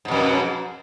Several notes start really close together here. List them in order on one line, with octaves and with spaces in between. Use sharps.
G#2 B2 F2